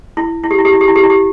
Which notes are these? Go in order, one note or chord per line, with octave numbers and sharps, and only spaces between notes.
E4
E4
G4
E4
G4
E4
G4
E4
G4
E4
G4